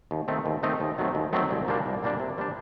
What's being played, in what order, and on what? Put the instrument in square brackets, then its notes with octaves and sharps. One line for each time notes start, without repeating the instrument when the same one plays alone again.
[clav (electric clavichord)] D#2
D#3 A3 C4 D#4
D#2
D#3 A3 C4 D#4
D#2
D#3 F#3 A3 C4
D#2
D#3 F#3 A3 C4
C2
A#2 G3 A#3 D4
C2
A#2 G3 A#3 D4
C3
G3 A#3 D4